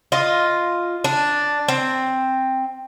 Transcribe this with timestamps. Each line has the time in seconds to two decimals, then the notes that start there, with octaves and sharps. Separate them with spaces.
0.12 F4 D#5
1.04 D4
1.68 C4